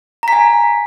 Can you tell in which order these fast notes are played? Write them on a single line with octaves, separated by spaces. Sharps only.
A#5 B6 G#5